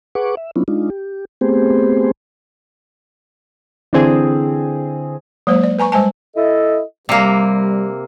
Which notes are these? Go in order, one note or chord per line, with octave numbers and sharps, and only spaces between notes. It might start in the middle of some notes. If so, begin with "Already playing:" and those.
G#4 B4 F#5 C#6 D6
E5
F#3 B3 C#4 D4 E4 F4
G#3 D4 D#4 F4
G4
A3 B3 C4 G4 G#4 C5
D3 E3 C4 G#4
F#3 G#3 A#3 C5
D5
B4 G#5 A#5 C#6
G3 G#3 C5 G#5 A5
E4 A4 D#5
C3 G3 A#3